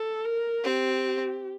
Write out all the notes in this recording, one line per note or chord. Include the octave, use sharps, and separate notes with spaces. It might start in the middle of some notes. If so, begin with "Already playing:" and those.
Already playing: A4
A#4
C4 G4